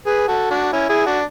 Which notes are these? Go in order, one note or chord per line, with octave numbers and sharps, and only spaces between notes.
G#4 B4
F#4 A4
D4 F#4
C#4 E4
E4 G#4
D4 F#4